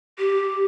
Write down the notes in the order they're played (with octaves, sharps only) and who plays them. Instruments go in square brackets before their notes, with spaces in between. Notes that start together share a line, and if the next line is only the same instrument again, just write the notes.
[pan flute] G4